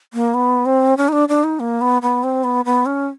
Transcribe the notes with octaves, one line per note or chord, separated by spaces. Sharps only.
A#3
B3
C4
C#4
D#4
D4
D4
D#4
A#3
B3
B3
C4
B3
B3
C#4